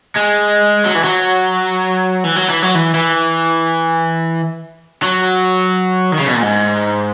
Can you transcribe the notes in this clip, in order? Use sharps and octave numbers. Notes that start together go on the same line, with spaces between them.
G#3
F#3
E3
F#3
E3
F#3
E3
F#3
E3
E3
F#3
D#3
C#3
B2
A#2
G#2